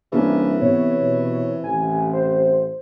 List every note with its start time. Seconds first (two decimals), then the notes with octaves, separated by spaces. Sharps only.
0.12 C2 E3 A#3 C#4 D4
0.61 C3 B3 C#5
1.00 B2
1.64 A1 G#5
2.13 C5